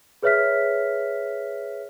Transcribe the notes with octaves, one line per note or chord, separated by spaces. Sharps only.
G#4 B4 C#5 E5 F6 B6